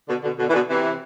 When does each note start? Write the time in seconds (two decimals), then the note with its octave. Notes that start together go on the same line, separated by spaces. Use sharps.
0.08 B2 D3
0.23 B2 D3
0.38 B2 D3
0.48 E3
0.53 B2 D3
0.68 C3 E3